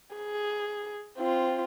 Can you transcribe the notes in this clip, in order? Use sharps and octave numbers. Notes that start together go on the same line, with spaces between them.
G#4
C4 F4